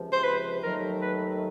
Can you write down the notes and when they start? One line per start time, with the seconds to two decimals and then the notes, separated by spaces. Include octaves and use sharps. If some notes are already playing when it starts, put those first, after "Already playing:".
Already playing: C#2 C3 F3
0.13 C5
0.24 B4
0.63 D#2 D#3 F#3 A3 A#4
1.01 B4